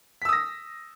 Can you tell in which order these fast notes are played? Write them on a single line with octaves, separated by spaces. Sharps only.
B6 E6 D#6 A#6